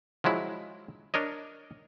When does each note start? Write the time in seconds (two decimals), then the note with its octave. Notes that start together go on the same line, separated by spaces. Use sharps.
0.24 F3 F#3 G#3 E4
1.14 D4 A#4 C#5 D#5